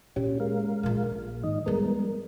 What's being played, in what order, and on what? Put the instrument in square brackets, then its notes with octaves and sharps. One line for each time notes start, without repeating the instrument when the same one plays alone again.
[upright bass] A#2 [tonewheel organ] C#4 G4
[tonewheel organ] G#3 A#4 F5
[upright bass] A#1 A#2
[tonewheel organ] G#2 D#3 D#5
[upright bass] F3 G3 [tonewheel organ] G#3 B3 A#4